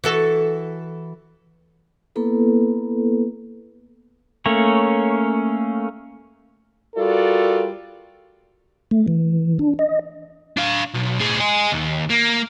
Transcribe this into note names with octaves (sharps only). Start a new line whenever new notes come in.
E3 F#4 A4
A#3 B3 E4 A4 B4
A3 A#3 C#4 C#5
G3 F4 F#4 A4 A#4 D5
A3
E3
D4
D#5
D4 F5
B1
A2 G#4
D#5 G#5
D#2
A#3